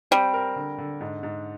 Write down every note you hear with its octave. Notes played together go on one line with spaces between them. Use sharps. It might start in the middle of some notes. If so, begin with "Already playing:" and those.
G3 C4
A#4
D3
D3
G#2
G#2